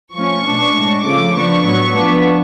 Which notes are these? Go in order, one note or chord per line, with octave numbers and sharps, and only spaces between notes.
F3 A3 C#4 C#6
B2 A3 D4
A2 G#3 D4
C#3 F3 A3 D6
F3 B3 D4 C#6
A2 F#3 B3
F3 B3 D4